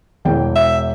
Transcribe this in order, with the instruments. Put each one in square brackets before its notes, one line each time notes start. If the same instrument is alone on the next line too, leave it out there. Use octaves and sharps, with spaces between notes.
[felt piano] E1 E3 G5
[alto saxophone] E5